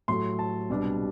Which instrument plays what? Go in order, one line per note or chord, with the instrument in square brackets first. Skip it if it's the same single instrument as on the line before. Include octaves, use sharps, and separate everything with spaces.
[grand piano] A2 F#3 A3 C6
A5
C2 B2 G3 D4